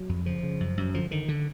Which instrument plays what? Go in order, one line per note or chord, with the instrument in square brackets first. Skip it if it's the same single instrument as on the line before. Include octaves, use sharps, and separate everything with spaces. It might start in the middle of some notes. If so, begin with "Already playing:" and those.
Already playing: [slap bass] F#3
F2
C#3 F3
C#3
F#2
F#2
D3 F3
D3 D#3
D3